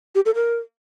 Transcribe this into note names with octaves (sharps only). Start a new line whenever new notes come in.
G4
A4
A#4